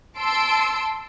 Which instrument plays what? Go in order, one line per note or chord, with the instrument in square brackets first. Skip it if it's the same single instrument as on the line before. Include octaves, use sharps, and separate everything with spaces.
[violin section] A5 C6 E6 D7